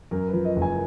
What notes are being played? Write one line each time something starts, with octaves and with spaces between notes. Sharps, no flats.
F#2 A#4
B4
F3
D#5
F#1
G#5